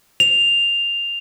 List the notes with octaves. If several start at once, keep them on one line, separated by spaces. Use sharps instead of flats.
F7